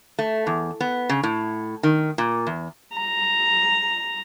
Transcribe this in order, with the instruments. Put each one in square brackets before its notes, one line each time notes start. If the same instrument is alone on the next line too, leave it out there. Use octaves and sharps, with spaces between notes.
[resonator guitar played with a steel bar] A3
E2
B3
C#3
A2
D#3
A#2
E2
[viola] A#5